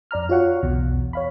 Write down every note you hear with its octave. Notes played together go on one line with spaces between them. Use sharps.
F2 D5 A#5 F6
F4 F#4 C#5 F5 F#5
B1 E2 B2
C#5 F5 B5